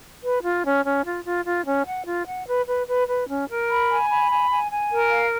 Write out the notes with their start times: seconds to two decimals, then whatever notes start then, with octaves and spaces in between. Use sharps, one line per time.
0.23 B4
0.44 F4
0.64 C#4
0.85 C#4
1.05 F4
1.25 F4
1.45 F4
1.65 C#4
1.86 F#5
2.06 F4
2.26 F#5
2.47 B4
2.67 B4
2.88 B4
3.07 B4
3.28 C#4
3.48 A#4
3.69 B5
3.89 G#5
4.09 B5
4.30 G#5
4.50 G#5
4.70 G#5
4.90 A#4
5.10 F5